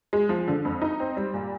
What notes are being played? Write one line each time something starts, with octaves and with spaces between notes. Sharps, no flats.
G#3
F3
D3
F2
D#4
C4
G3
A#2